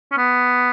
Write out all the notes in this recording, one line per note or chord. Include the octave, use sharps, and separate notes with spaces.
C#4
B3